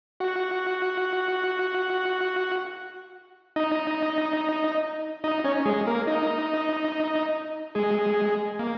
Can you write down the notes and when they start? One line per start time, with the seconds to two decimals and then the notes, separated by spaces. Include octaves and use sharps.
0.20 F#4 F#5
3.56 D#4 D#5
5.24 D#4 D#5
5.44 C#4 C#5
5.66 G#3 G#4
5.87 A#3 A#4
6.07 D#4 D#5
7.75 G#3 G#4
8.59 A#3